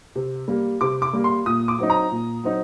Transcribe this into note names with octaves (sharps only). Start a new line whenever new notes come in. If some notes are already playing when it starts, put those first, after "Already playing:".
C3
G3 A#3
C3 D6
D6
G3 A#3
C6
A#2 D#6
D6
F#3 C4 D#4
A#5
A#2
F#3 C4 D#4